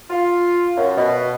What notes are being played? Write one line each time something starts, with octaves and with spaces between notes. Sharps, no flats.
F4
F#2
B2